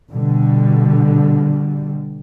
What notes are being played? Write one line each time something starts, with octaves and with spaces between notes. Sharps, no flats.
B2 D3 G3